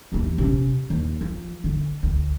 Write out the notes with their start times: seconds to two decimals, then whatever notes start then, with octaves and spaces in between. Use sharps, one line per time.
0.12 D#2 E3
0.38 C3 C#4
0.90 D#2
1.21 F3
1.64 D3
2.03 D2